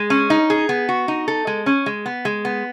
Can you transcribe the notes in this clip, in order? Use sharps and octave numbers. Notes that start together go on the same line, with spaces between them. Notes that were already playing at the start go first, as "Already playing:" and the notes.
Already playing: G#3
C#4
D#4
G#4
B3
F#4
D#4
A4
G#3
C#4
G#3
B3
G#3
B3